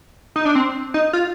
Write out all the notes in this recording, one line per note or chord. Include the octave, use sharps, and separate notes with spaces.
D#4
D4
C4
D#4
F4